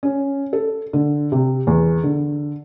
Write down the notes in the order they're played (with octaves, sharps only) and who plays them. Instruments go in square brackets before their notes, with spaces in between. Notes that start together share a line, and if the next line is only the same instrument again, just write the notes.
[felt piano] C#4
A4
D3
C3
E2
D3